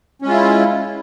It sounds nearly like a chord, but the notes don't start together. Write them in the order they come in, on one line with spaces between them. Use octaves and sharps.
C#4 G#3 F4 E4